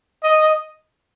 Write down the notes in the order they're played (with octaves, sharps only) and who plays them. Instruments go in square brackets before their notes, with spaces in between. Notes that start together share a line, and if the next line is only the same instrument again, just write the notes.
[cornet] D#5